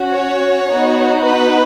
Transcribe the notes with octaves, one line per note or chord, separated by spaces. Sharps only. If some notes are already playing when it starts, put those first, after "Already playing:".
Already playing: C#4 F#4
C#5
B3 D#4 F#4
B4